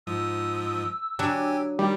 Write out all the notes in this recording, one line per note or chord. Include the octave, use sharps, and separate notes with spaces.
G#2 F3 D#6 E6
F#3 D4 G4 G#5
D#3 G3